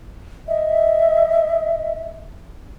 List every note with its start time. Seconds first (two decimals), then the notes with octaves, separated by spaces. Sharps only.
0.47 D#5 E5